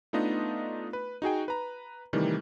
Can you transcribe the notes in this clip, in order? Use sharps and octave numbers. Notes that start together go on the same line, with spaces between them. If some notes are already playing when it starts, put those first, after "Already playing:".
A3 B3 D4 D#4 F4 D#5
B4
D#4 F#4 G#4 G5
B4 A#5
C3 D#3 E3 G3 A3